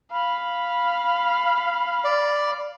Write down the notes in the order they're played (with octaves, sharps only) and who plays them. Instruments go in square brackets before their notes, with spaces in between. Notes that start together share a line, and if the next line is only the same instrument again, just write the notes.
[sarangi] F5 [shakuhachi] B5
[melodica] D5